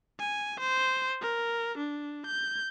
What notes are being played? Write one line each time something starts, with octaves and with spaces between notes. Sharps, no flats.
G#5
C5
A#4
D4
G6